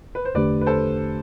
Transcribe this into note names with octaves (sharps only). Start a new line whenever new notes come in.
B4
C5
E2 D3 A3 D4 G4 B4 D5
B4
A4 C5